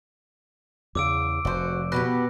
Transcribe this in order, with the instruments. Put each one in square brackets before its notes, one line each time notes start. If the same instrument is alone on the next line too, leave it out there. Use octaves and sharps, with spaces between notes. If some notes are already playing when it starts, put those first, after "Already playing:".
[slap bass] E2 C#3 [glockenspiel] D6 E6 D7
[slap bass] F1 [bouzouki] F#4 C5
[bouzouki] B2 B3 G4 [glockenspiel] F#6 A#6